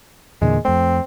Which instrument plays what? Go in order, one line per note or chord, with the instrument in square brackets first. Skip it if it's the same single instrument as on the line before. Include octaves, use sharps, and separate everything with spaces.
[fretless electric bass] E2 A#2 D3 [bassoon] G#3
[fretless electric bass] F2 A3 [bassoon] C4